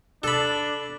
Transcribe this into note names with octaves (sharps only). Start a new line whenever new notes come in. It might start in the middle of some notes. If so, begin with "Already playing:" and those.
D4 A4 B5